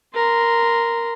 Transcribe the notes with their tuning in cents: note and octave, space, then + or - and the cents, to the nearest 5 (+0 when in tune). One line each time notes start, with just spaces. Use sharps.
A#4 +0 C6 -20